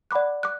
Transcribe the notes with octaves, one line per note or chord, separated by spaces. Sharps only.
D5 F#5 B5 D6 F#6
D6 F#6